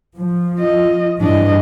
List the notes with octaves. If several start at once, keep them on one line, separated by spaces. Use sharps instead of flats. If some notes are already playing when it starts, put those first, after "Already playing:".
F3
F4 D#5
G2 E3 D4 D#5